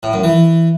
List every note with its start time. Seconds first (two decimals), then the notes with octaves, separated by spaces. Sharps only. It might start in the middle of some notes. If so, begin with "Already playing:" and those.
0.03 A2
0.13 F#2
0.24 E3